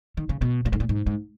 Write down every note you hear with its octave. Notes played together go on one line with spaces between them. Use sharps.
D#3
C#3
B2
A#2
G#2
A#2
G#2
G#2